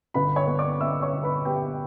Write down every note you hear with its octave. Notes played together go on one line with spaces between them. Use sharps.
G1 B4 B5
C#5 C#6
B3
D5 D6
B3 E5 E6
C#5 C#6
G1
B4 B5
B3 G4 G5